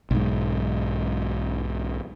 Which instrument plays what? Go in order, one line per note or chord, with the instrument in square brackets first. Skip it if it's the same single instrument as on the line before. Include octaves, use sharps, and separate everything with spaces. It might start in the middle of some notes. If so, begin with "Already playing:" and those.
[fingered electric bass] B1 G#2